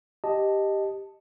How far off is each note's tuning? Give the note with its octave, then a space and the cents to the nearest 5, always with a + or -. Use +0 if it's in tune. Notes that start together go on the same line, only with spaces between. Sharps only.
G4 +0 D#5 +0 A5 +0